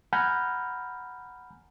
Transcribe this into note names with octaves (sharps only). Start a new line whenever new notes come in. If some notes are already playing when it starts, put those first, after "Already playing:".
F#5 G#5 A#5 B5 F6 G6